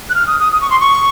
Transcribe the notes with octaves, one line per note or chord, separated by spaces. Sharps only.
F#6
F6
D#6
D#6
D#6
C#6
C6
C#6